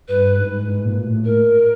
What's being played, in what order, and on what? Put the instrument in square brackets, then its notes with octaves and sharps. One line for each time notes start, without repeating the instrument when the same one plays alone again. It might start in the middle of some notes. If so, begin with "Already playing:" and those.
[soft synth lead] G2 [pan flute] B4
[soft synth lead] G#2
G#2
A#2
A2
[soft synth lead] A2 [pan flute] A#4